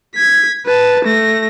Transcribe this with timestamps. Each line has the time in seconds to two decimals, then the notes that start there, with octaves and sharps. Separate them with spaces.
0.15 G#6 B6
0.66 B4 A5
1.04 A3 A#6